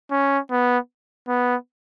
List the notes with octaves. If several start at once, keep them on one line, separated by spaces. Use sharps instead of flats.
C#4
B3
B3